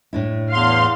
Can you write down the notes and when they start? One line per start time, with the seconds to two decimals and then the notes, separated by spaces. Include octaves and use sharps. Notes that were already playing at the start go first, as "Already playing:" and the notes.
0.13 A2 D4 E4
0.53 E2 F5 C6